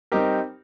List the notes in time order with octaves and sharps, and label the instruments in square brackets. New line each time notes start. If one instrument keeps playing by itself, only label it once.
[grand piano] G3 C4 D#4 G4 A#4